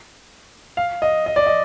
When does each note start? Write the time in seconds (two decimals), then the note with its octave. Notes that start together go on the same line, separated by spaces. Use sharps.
0.77 F5
1.02 D#5
1.26 D#5
1.36 D5
1.46 D#5